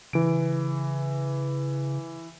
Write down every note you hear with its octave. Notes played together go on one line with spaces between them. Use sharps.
C#3 E3 D7